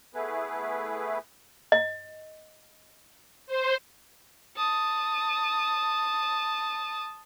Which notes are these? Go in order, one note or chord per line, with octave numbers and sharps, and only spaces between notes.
A3 B3 E4 G#4 B4
D#5
C5
A5 D#6